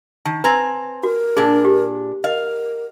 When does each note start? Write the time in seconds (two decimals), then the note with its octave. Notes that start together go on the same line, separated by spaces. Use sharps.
0.25 D#3 A5
0.44 C4 B4 G#5 A#5
1.03 F#4 A#4
1.37 A#2 D4 G#4
1.65 G4
2.24 A#4 D#5 F5